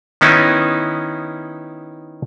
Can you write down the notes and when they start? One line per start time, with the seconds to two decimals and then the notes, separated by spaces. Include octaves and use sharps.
0.21 D#3 B3 C#4 D#4 E4